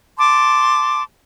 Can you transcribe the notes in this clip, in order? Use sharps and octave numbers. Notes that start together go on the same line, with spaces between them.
A5 C6 D6